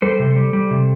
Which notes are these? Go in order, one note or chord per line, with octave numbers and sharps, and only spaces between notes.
G3 A4 C5
C3
G3
G3
C3